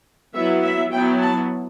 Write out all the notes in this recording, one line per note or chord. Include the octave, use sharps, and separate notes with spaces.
F#3 B3 E4 E5
E5
F#3 B3 E4 G5
A5